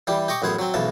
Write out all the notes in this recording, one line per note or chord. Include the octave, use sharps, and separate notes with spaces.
E3 G3 G4
G4 D#5 C#6 D6
A1 F#2 B3 G#4 C5
F#3 C4
B1 G#2 C#3 E3 A5